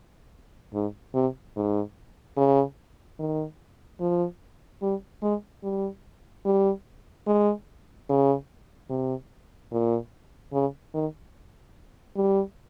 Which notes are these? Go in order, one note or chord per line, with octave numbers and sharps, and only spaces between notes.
G#2
C3
G#2
C#3
D#3
F3
G3
G#3
G3
G3
G#3
C#3
C3
A#2
C#3
D#3
G3